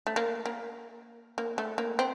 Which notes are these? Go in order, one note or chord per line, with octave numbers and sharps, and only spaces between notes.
A3
A#3
A#3
A#3
A3
A#3
C4